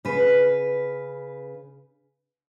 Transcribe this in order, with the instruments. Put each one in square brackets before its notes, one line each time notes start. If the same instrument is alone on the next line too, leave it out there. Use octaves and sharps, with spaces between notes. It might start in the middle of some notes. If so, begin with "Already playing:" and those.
[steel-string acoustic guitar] C#3 B4